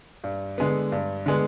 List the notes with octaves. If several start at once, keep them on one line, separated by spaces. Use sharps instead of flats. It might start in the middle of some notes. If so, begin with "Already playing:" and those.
G2
D3 G#3 B3
G2
D3 G#3 B3